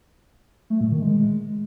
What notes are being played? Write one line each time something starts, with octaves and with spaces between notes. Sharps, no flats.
A3
A#2
D#3
G#3